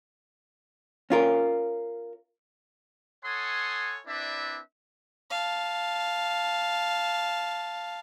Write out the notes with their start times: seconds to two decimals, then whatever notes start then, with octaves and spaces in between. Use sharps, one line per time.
1.10 C#4 F4 A#4
3.25 A4 C#5 F#5 G#5 C6 D#6
4.07 C4 D4 E4 B4 D5 E5
5.31 F5 A5